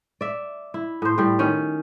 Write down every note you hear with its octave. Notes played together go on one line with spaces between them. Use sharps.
D5 E5
E4
A2 C5
A2 G3
D#3 C#4